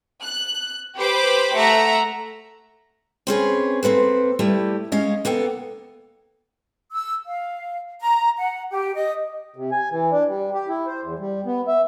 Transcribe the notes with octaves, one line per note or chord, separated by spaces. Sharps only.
F#6
G4 B4 C5 B5 D6
A3 E5 F#5 A#5
C4 C#4 G#4 B4
A#3 C4 A4 B4
G3 A3 E4 G4
G#3 C#4 D#5 F5
A#3 B3 A4 G5
E6
F5
A#5
F#5
G4
D#5
C3
G#5
E3
D4
G3
G4
E4
C5
E2
G3
B3
E5